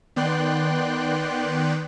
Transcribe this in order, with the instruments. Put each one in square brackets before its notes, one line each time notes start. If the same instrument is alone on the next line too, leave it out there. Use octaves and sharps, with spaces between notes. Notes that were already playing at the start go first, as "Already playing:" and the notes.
[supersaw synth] D#3 B3 D5 G5 C6 F#6